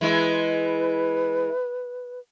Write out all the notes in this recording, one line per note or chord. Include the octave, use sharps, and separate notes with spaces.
E3 G#3 E4 B4